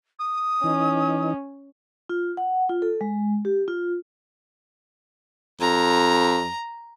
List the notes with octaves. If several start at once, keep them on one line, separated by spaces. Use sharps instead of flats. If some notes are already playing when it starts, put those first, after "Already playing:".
D#6
E3 C#4 D#4
F4
F#5
F4
A4
G#3
G4
F4
F2 A#5